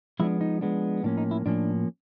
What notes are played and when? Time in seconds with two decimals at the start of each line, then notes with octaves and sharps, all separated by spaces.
0.20 F3 G#3 B3 D4 E4
0.41 D#4
0.61 F3 G#3 B3 D4
1.03 A2 F3 A#3 C#4 D4
1.18 D#4
1.31 E4
1.46 A2 F3 A#3 C#4 D4